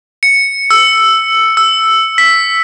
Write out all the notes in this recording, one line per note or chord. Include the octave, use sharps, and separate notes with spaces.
C#7
E6
E6
B6